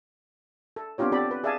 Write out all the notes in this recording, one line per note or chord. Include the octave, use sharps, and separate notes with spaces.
A4
B3 C4 D4 F4 G4 C#5
C4 G4 A4 D5 B5
B4
G#4 D5 E5 F5 G#5 A5